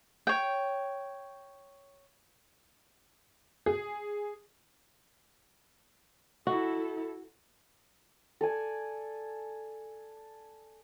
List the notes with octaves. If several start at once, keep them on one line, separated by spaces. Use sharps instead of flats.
C#5 G5
G#4
E4 F#4 A4
A4 D5 G#5